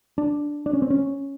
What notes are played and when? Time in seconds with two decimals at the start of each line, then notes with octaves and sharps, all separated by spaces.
0.18 D4
0.66 D4
0.73 C#4
0.82 C4
0.90 C#4